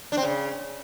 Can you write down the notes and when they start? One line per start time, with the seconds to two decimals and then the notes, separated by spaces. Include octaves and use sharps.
0.12 D4
0.17 C4
0.23 C#3